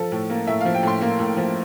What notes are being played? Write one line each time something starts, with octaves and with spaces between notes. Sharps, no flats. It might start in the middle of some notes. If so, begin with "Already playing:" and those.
Already playing: F3 A4
A2
A#3
A2 E5
F5
F3
G5
A2 C6
A#3
A2
F3